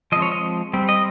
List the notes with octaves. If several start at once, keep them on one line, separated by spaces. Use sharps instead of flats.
F3 G#3 C4 D#5
C#5
D#5
G3 C4
D#5